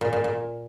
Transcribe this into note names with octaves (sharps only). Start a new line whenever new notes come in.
A#2
A#2
A#2